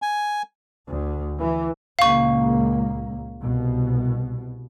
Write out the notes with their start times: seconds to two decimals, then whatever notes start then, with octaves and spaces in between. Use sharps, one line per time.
0.02 G#5
0.88 D2
1.39 E3
1.99 C#2 A#2 A#3 F5 C#6
3.40 C2 B2